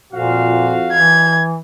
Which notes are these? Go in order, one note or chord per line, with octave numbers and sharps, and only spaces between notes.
F2 A#2 F#4 F5
E3 G#6